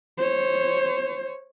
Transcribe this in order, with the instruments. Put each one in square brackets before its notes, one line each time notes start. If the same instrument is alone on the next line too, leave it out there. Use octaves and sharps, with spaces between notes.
[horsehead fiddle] C5 C#5